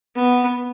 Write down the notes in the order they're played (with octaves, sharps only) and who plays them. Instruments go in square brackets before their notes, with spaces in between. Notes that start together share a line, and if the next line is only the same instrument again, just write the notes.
[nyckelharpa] B3